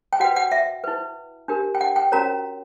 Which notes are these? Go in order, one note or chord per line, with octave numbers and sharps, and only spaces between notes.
G5
F#4 B4 F#5
F#5
E5
E4 B4
D4 G4 A#4
G5
F#5
G5
C#4 F#4 A#4 C#5 A#5